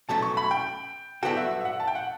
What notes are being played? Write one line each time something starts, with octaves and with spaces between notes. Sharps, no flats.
B2 F#3 A3 C#4 A5
C#6
B5
G5
G2 F#3 B3 F#4 A4 G5
E5
E5
F#5
A5
G5
F#5